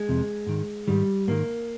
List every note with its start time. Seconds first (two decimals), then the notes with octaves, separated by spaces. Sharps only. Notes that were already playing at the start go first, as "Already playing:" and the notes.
Already playing: G#3
0.09 F2 C3
0.47 G#2 D#3
0.88 G#2 D#3 G3
1.27 G#2 D#3 A#3